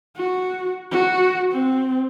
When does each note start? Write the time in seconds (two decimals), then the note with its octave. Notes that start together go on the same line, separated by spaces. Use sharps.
0.17 F#4
0.92 F#4
1.52 C4